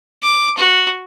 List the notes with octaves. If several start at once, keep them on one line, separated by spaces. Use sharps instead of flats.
D6
F#4